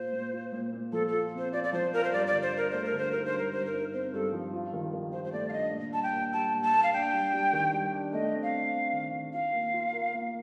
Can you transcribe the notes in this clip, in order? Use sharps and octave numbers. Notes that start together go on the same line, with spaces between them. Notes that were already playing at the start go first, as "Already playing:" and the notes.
Already playing: A#2 F4 C5
A#2
F4
A#2
A#2
F3 A4
A4
F4
C4
C5
F4 D5
D5
F3 C5
F4 A#4
C5
G2 D5
D5
D3
C5
D3 A#4
A3 C5
A#4
D3
C5
D#4 A#4
C5
G2
A#4
G2 C5
A#4
D#4
C4 C5
G2 A4
F3
F4
D#3
D#3
F4 C5
C5
A3 D5
F5
D4 D#5
A#2
G3 A5
G5
A#3
G3 A5
A#2
A5
A#3
F5
D4 G5
G3
G3
D#3
G3
D4
A3 D#5
C4
F5
C4
C4
D#3
D#3
F4 F5
A#3
F4
A#4
A#3